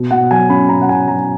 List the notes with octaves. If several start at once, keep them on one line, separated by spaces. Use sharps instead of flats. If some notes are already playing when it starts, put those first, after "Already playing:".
Already playing: B2
B2 F#5
F#3 G#5
C#4 B5
B2 A#5
F#5
B2 G#5
F#3 A#5